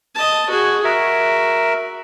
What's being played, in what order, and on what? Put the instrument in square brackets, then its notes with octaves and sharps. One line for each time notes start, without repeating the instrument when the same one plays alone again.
[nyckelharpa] D#5 A5
F#4 G#4
[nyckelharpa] F#4 [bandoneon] A#4 E5